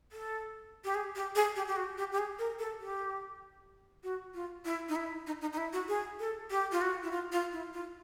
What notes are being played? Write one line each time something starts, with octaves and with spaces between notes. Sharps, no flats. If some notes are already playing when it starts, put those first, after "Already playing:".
A4
G4
G#4
G4
G#4
G4
G4
F#4
G4
G4
G#4
A#4
A4
G4
F#4
F4
E4
D#4
E4
D#4
D#4
D#4
E4
F#4
G#4
A4
G4
F4
F#4
E4
F4
F4
E4
F4